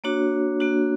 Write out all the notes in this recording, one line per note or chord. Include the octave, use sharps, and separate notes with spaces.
A#3 D4 F#4 C#5
A#3 D4 F#4